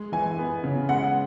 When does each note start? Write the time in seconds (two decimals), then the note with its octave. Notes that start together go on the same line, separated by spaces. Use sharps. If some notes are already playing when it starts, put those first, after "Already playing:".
Already playing: G#3
0.12 E3 G#5
0.38 B3
0.64 C#3
0.89 G#3 F#5